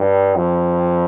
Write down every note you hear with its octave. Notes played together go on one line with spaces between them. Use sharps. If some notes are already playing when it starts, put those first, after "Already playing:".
Already playing: G2
F2